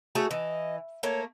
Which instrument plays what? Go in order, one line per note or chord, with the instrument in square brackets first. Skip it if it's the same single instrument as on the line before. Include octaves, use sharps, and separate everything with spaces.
[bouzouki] A3 C#4 G#4 [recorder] F#4
[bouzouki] E3 [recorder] D#5
[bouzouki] A3 A#3 [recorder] C#5